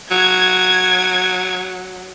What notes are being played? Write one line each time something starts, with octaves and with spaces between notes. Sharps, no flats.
F#3 G#6